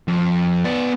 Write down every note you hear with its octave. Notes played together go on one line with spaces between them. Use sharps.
F2
B3 D5